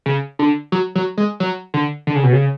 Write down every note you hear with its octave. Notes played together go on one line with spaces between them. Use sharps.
C#3
D3
F#3
F#3
G#3
F#3
D3
D3
C#3
B2
C#3